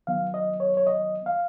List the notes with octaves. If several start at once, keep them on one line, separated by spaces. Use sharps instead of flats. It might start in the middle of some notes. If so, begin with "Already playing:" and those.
D#3 F#3 B3 F5
D#5
C#5
C#5
D#5
F5